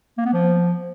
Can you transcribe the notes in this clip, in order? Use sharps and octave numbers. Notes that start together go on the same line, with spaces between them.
A#3
B3
F3